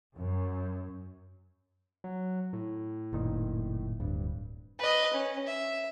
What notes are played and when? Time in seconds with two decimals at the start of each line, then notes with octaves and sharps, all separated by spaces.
0.16 F#2
2.04 F#3
2.53 A2
3.13 F#1 A#2 D#3
4.00 D1 G2
4.79 B4 D#5
5.13 C#4
5.47 E5